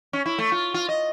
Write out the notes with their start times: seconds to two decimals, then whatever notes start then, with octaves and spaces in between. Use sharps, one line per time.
0.13 C#4
0.26 E4
0.38 A3
0.52 F4
0.74 F4
0.89 D#5